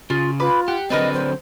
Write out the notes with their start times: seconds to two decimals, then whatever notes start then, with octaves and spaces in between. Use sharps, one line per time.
0.10 C#3 F4
0.40 F4 B4 B5 D6
0.68 G4 F#5
0.90 D3 F#3 C4 A#4 B4 D5 D#5
1.13 C5